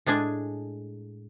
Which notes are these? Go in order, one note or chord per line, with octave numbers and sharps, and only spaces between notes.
A2 G#3 D4 G#4 G#5